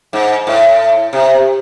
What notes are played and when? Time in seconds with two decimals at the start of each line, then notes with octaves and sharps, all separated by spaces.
0.13 G#2
0.47 A2
1.13 C3